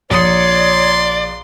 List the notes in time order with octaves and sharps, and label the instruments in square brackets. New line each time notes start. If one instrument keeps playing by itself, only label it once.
[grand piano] A#1 D#6 C#7 [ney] C#5 [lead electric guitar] D5 [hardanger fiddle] C6